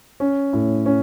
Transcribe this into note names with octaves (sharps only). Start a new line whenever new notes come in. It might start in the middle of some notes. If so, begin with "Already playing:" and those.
C#4
A2
C#4